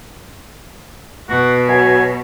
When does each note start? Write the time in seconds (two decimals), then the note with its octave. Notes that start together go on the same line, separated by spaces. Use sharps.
1.29 B2 F#4
1.68 F#3 G#5